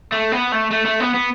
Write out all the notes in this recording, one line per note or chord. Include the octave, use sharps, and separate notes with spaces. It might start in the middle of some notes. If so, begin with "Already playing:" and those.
A3
B3
A3
A3
A3
B3
B3